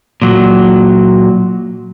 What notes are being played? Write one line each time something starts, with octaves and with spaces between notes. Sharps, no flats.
A#2 F#3